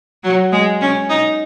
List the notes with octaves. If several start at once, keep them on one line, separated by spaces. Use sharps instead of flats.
F#3
G#3
C#4
D#4